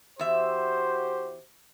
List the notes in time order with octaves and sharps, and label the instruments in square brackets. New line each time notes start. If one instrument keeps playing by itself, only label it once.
[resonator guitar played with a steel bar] E2 E5 [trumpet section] F#4 G4 C5